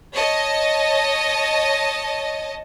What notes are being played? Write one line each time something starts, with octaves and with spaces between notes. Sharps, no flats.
C#5 D#5 A5